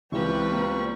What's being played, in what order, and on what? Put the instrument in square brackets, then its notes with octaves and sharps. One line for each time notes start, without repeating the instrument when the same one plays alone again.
[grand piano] C#2 [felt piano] E3 [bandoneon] F3 G3 C#6 [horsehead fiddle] C4 B4
[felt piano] A#3